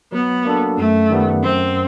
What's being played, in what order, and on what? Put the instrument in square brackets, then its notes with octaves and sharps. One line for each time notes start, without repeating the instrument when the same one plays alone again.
[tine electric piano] F#3 [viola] B3
[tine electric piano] A#3 D4 F#4 A4
[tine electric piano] F#2 [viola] A3
[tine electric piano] D#3 G3 B3
[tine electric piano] F#2 [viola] C4